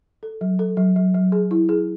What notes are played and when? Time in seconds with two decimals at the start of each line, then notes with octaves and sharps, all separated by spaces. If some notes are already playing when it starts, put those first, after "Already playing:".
0.23 A4
0.41 F#3
0.59 A4
0.77 F#3
0.96 F#3
1.14 F#3
1.32 G#4
1.51 E4
1.69 G#4